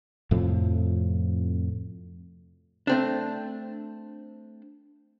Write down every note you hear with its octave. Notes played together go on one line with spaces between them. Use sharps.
F2 A2 C3 F3
A3 C4 D4